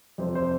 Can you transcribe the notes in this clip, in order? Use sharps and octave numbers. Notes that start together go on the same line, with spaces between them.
F2 C3 F3 C5
C5